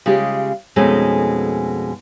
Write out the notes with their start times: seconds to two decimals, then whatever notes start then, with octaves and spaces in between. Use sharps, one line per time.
0.06 C#3 G#3 F4 G4
0.76 F2 B2 G#3 A3 C#4 D#4